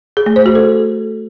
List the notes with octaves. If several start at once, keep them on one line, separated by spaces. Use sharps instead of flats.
G#4
A3
C5
F#4
A4